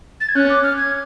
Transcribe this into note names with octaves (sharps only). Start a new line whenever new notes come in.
A6
G#6
C#4 F#6
D6
F6
G#6